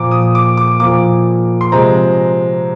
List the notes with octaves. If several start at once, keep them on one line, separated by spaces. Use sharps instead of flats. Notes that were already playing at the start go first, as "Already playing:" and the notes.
Already playing: A#2 F3 A#3 D6
D#6
D6
D6
A#2 F3 A#3 D6
C6
C3 F3 G#3 C4 A#5